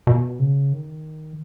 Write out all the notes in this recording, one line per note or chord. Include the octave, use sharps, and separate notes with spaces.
B2
C#3
D#3